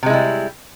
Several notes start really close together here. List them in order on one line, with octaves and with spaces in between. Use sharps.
C3 G#3 E4 G3